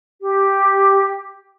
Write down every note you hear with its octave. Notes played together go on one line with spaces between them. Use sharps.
G4